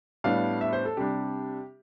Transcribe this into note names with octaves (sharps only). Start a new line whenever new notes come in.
A2 G3 B3 D4 F5
E5
C5
A4
C3 G3 D4 G4